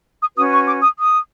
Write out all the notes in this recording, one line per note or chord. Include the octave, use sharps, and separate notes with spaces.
D#6
C#4 F#4 B4 D#6
C#6
D6
D#6
D#6